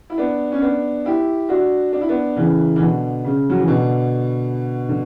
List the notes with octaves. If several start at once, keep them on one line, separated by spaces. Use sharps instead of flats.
E4
B3 D4
C#4
B3 D4
E4 G4
D4 F#4
D4
E4
B3 D4
C#3 E3
E3
B2 D3
C#3
F#3
E3
B2 D3
D3